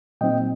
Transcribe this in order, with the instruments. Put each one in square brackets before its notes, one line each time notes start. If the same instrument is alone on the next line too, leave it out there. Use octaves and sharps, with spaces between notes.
[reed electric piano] A#2 F#3 C4 D#4 D#5 G5